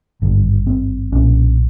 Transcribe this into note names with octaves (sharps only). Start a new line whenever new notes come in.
G#1 G2 D3
C4
B1 A#2 C#4